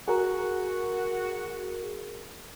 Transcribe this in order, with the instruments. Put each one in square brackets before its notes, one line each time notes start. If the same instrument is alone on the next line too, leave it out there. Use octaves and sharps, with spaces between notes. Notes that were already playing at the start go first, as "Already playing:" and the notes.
[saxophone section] F#4 [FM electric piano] G#4 A#4